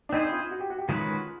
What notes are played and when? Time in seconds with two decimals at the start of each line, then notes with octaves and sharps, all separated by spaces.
0.09 D4
0.12 C4 D#4 E4 G#4 C5
0.31 F4
0.51 F#4
0.60 G4
0.70 F#4
0.78 G4
0.88 D#3 G#3 C#4 F4 F#4 B4